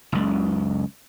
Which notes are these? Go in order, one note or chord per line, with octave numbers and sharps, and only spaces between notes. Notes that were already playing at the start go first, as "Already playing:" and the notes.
F#1 C#2